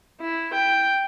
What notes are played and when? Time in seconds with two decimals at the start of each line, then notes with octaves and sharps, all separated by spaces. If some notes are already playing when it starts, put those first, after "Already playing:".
0.21 E4
0.53 G5